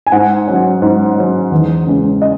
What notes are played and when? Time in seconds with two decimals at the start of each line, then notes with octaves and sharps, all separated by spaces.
0.07 G#5
0.12 G#2 F#5
0.47 F#3 C#4
0.82 G#2
1.17 F#3 C#4
1.51 E2
1.87 C#3 G#3 C#4
2.22 D#5